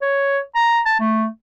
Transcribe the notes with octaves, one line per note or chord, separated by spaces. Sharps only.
C#5
A#5
A5
A3